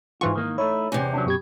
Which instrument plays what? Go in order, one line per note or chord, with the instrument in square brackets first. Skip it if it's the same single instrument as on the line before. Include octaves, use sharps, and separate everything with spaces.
[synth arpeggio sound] G#2 E3 C#6 [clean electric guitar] F4
[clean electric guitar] D#3 A#3 D#4
[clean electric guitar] A3 D#4 E4 [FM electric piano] C#5
[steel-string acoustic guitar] E2 C3 [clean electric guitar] C#4
[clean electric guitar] F#3 C#4 D4
[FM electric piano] F#2 G4 G#6 [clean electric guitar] B2